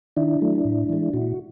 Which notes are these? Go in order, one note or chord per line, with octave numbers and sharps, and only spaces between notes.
D#3 D4 E4
F#3 A3
A2
E3 G#3
A#2 E4 F#4